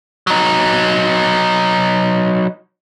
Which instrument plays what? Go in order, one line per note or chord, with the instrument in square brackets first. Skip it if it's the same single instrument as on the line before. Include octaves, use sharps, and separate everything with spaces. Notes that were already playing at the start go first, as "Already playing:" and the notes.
[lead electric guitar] F#3 D#4